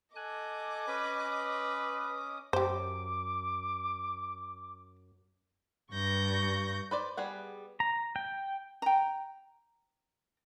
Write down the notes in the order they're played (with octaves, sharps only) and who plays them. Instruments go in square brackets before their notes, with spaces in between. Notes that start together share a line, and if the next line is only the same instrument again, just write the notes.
[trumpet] A4 [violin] D#5 D6 [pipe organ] G#5 F#6
[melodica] C#4 [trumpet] B4
[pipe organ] D#6
[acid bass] F#2 [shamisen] G4 C5 [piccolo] D6
[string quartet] G2 C#6 G6 A#6
[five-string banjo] B4 C5 D5
G3 B3 G#4 F#5
[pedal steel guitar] A#5
G5
[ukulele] G5 A#5